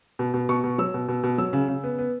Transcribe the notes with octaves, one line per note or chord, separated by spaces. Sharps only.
B2
B2
B2 C#6
B2
F#3 E6
B2
B2
B2
F#3 E6
C#3
C#3
B3
B3